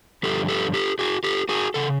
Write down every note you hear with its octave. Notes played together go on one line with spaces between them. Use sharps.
G2 D3 F3 G4 A4
G4 A4
G4 A4
F#4 G#4
G4 A4
F#4 G#4
C#3 A4